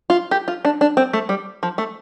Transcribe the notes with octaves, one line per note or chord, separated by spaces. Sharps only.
F4
G4
F4
D4
D4
C4
A3
G3
F3
A3